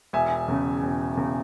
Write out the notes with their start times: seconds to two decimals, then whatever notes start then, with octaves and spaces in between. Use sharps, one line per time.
0.13 E1 E5 G#5
0.48 E2 C#3
0.83 E1
1.17 E2 C#3